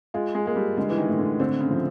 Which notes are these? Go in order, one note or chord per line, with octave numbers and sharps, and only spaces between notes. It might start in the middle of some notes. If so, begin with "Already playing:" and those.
G#3 F4
G#3
G#3 A#3
G3
D3 G#3
E3
D#3
A2
D3
D3 C4
C#3
F3